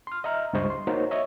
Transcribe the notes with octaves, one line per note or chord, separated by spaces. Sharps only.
C6 F6
D#5 E5 A#5 F6
C#2 G2 G3 C5 D#5 C#6
C6
A#3 D#4 F#4 C5 C#5
C#5 D#5 E5